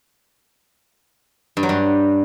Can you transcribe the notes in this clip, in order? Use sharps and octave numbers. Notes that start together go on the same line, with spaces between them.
G2
F#3
G2